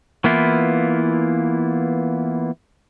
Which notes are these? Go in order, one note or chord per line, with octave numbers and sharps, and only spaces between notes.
E3 A#3 B3 E4 F4